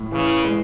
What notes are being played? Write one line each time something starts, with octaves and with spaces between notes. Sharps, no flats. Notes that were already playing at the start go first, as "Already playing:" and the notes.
Already playing: A2
C#3 E3
G#3